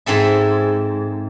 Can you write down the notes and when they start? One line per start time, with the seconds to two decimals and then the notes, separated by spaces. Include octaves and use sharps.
0.06 G#2 C4 A4 E5